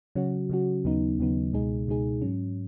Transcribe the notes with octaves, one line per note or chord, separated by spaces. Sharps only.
C#3 F#3 C#4 F#4
C#3 F#3 C#4 F#4
D#2 C#3 F#3 B3 D#4
D#2 C#3 F#3 B3 D#4
C#2 B2 G#3 D#4 G#4
C#2 B2 G#3 D#4 G#4
G#2 F#3 C#4